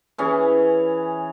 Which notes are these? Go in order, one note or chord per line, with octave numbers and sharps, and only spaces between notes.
E3 C#4 G#4